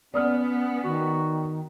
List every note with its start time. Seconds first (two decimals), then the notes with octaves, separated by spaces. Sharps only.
0.14 B3 C#4 D5 D#6 F6
0.84 D#3 F#4